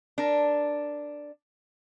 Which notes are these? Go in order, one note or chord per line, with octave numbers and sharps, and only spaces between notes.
D4 A#4